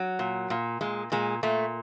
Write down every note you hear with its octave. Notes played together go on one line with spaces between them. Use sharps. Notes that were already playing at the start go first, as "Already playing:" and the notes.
Already playing: F#3
A#2
A#2
A#2 G#3
A#2 G#3
A#2 A3